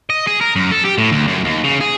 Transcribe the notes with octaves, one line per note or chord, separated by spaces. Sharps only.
D#5
G#4
A#4
F#2
A4
G4
A2
D2
F#2
D#2
C#3
G#4